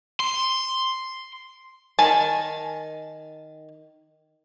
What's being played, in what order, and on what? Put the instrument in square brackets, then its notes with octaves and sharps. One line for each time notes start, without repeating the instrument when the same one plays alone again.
[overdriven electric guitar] C6
[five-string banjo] D#3 G#5 A5